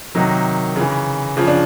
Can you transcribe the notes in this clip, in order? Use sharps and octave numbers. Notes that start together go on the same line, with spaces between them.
C3 D#3 F#3 D#4
C#3 E3
C#3 F3
D4